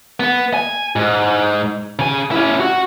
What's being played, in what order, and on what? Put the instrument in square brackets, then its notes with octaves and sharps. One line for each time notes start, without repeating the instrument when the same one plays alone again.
[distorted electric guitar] B3
G#5
G#2
C#3 G#5
C#4 E4
F#4